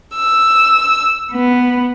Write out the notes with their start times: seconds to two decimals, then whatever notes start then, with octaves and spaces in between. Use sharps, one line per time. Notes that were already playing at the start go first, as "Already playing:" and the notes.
0.15 E6
1.32 B3